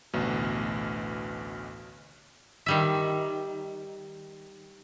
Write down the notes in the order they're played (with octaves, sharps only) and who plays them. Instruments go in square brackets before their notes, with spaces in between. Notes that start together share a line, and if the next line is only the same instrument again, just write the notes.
[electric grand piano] A1 D2 B2
[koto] D#3 G3 E5